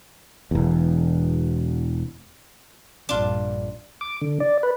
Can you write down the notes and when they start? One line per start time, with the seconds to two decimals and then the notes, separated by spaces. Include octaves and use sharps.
0.51 E1 E2
3.09 A#1 G2 D4 F4
4.01 D6
4.21 D3
4.40 D5
4.63 B4